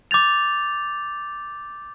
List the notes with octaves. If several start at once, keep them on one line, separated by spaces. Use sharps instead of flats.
D6 G6 A6 F7